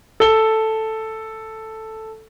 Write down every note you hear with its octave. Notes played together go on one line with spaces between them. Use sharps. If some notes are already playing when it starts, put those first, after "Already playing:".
A4 G7